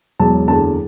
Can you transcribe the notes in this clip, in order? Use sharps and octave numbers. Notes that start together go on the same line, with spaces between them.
E1 E2 B2 F#3 A5
F#1 E2 D3 F#3 A5